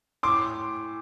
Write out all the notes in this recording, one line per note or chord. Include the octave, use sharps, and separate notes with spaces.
A2 C6 D6